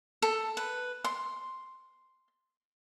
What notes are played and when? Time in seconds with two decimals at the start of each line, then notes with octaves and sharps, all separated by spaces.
0.22 A4
0.57 B4
1.04 C6